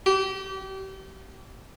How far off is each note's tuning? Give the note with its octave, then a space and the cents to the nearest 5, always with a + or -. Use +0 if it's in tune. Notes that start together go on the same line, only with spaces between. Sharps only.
G4 -30